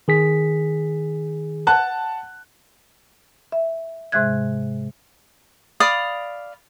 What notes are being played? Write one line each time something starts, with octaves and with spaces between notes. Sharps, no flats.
D#3 G#4 B6
F#5 A5 F#6
E5
G#2 C3 G#3 E5 F#6 G#6
D5 F5 B5 D#6